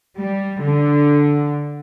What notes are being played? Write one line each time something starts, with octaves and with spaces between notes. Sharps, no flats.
G3
D3